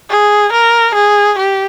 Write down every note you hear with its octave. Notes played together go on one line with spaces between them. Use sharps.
G#4
A#4
G#4
G4